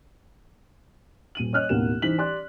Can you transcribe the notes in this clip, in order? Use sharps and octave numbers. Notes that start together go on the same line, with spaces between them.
D#1 D#7 F#7
C#5 D#5 F6 F#6
A1 D#2 B2 A#4 F#5 E7
E3 D#4 C5 F#6 B6 F#7
G4 D5 C6 F#6